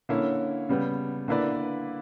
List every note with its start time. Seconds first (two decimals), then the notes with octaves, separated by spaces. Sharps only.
0.09 D3 A#3 C#4 E4
0.69 C#3 G3 B3
1.28 D3 A#3 E4 B4 D5